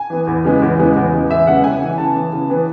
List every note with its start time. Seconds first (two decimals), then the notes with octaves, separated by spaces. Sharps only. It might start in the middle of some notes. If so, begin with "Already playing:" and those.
Already playing: G#5
0.10 E3 B3
0.27 E2
0.45 C#3 G#3 B3
0.62 E2
0.79 C#3 G#3 B3
0.96 E2
1.13 C#3 G#3 B3
1.29 E2 E5
1.47 C#3 G#3 B3 F#5
1.64 C#3 G#5
1.82 E3 B3
1.98 C#3 A5
2.15 E3 B3
2.33 C#3
2.50 E3 B3